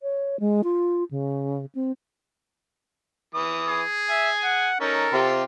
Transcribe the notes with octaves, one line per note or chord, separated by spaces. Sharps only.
C#5
G#3
F4
C#3
C4
E3 D#6
G#4
E5 G#5
F#5
C#4 D#4 A4 A#4
C3 F4 G4 C6